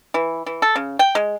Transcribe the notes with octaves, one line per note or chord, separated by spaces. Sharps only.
E3
E3
A4
C#3
G5
G#3